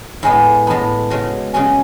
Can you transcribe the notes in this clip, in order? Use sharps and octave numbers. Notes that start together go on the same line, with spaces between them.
A2 G#3 B3 G#5
A2 G#3 B3 A5
C#3 G#3 C#4 F#4
C#3 G#3 C#4 F#4 G#5